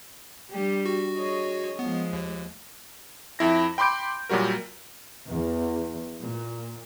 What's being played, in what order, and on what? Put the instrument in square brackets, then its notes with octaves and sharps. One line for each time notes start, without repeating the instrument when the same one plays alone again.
[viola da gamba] G3 D4 G4
[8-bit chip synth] F#4
[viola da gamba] G#4 C#5 D#5
[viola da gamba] F3 G#3 [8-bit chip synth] B3
[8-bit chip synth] D#2
[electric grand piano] F2 E4 A#6
G5 B5 C6 D6 G6 D7
A#2 F#3 G3 F#4 A#4
[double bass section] E2
A#2